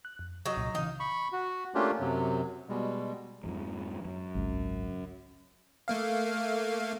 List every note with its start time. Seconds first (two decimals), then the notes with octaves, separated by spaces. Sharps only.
0.05 F#6
0.19 F2
0.46 F#3 D#4
0.57 C2 A#2
0.75 C#3 E3 D#4 F5
1.00 B5 C#6
1.32 F#4
1.75 A3 A#3 C#4 D4 F4 G4
2.00 F#2 C3 F#3
2.69 B2 G3 G#3
3.44 F2 G#2
4.05 F#2
4.35 G#1 C#2
5.88 A3 A#3 F5